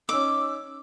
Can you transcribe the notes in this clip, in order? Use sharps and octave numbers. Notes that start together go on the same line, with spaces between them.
C#4 D#4 D6 E6